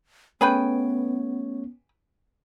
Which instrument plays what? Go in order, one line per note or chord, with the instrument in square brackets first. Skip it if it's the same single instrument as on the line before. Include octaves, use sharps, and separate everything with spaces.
[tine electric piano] A3 C#4 C#5 [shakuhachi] B3 [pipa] G#4 B4 G5